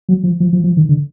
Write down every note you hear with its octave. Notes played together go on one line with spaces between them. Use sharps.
F#3
F3
F3
F3
F3
D#3
D3